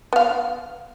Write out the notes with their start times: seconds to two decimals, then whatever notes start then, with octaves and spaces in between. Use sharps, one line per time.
0.13 B3 F5